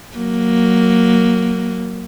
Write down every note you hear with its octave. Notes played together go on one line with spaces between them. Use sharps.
F#3 A#3